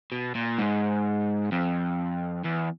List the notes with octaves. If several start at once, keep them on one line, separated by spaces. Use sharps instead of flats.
B2
A#2
G#2
F2
E2